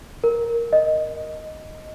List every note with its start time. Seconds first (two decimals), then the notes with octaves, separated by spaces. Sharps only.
0.24 A#4
0.73 D#5